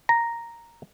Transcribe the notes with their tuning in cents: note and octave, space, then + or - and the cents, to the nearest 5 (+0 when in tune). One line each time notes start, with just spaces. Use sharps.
A#5 +0